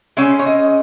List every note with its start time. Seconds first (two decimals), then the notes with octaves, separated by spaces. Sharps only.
0.17 C#3 G#3 C#4 E5
0.39 C#5
0.46 D#5